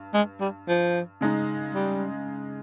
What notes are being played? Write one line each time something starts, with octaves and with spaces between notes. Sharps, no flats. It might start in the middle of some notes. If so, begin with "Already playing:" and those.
Already playing: G2
G#3
G3
F3
C#3 G#3 D#4
G3